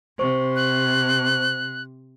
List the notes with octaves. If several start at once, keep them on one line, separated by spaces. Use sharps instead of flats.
C3 C5 C#6
F#6